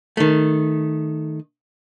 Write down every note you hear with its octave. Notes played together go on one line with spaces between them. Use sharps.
D#3 A3